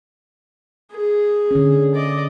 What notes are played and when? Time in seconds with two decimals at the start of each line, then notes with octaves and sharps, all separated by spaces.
0.92 G#4
1.51 D3 C#4
1.95 D5 D#5